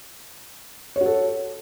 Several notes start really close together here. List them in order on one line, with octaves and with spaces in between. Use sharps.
C#5 F#4 A4